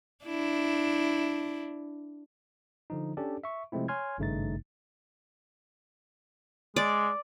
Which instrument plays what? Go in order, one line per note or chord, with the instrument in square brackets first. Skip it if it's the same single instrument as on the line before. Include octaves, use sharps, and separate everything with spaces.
[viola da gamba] D4 E4
[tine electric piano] D3 F3 D#4
C#4 D4 G4 A4 D5
E5 C#6
C3 F3 G#3 A3 C4 E4
C#5 G#5 C6 F6 G#6
G#1 G2 C#3 A3 D#4 A6
[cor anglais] G#3 [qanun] D5